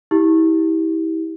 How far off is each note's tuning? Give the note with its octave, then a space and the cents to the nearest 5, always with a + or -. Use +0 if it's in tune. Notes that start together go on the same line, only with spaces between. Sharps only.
E4 -35 G4 +0